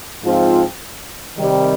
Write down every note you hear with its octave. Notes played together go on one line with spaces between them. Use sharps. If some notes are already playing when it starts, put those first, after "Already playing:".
G#2 F3 C4 F4
C3 D#3 G3